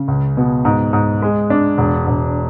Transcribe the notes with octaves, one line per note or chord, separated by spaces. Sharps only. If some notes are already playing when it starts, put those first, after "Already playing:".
Already playing: C#3
C#2
B2
G#2
G#2
G#3
D4
E1
E1